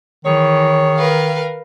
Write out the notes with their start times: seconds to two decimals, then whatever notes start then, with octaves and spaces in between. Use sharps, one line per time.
0.25 D#3 E3 G#4 C#5
0.96 A#4 B4 F5